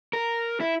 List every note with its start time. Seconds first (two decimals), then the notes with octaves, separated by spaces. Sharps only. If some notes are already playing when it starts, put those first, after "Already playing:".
0.13 A#4
0.60 E4